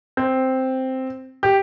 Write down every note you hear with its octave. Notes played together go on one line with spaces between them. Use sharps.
C4
G4